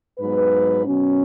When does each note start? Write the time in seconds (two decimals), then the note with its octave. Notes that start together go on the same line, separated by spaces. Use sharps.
0.19 G#2 F#3 B3 B4
0.85 B2 F#3 C#4